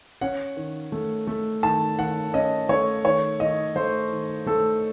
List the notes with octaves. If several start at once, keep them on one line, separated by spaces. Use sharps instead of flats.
C#4 F#5
D#3
A3
A3
D#3 A5
D#3 F#5
C#4 D#5
A3 C#5
D#3 C#5
D#3 D#5
A3 C5
D#3
A3 A4